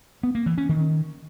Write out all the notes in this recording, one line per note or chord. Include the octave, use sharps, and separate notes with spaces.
B3
A#3
E3
C#4
D#3